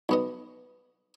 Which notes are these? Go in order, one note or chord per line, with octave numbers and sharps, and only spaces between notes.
B1 B3 D#5